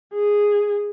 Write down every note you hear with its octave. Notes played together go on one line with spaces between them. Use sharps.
G#4